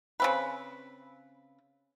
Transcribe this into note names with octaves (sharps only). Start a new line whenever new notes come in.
C#3 C4 B4